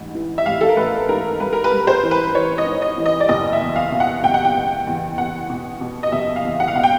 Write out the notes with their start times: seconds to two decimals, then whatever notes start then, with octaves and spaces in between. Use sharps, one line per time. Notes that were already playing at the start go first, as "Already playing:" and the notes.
Already playing: A1 G#2
0.14 E3
0.38 E5
0.46 A1 F5
0.61 A4
0.69 A#4
0.77 A1 B4
1.09 G#2 A#4
1.40 G3 B4
1.53 A#4
1.64 B4
1.72 G3
1.87 C5
2.03 E3
2.11 B4
2.34 E3 C#5
2.58 D#5
2.66 G#2
2.82 D#5
2.97 E3
3.06 D#5
3.20 D5
3.29 F#1 D#5
3.53 E5
3.61 E2
3.76 F5
3.92 B2
4.00 F#5
4.23 F#1 G5
4.34 F#5
4.44 G5
4.55 B2
4.87 E2
5.18 E2 F#5
5.50 B2
5.81 B2
6.03 D#5
6.12 F#1 E5
6.36 F5
6.44 E2
6.60 F#5
6.68 F5
6.75 B2 F#5
6.83 G5